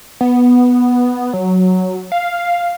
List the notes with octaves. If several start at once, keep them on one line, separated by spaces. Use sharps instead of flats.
B3
F#3
F5